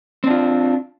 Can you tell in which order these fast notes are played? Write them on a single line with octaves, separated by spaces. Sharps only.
C4 D4 F4